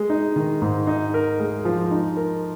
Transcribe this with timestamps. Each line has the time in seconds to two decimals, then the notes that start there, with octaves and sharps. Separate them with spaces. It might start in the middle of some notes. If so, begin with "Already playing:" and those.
Already playing: G#3
0.10 D#4
0.36 D#3
0.62 G#2
0.87 D#4
1.14 A#4
1.40 G#3
1.65 F3
1.91 D#4
2.17 A#4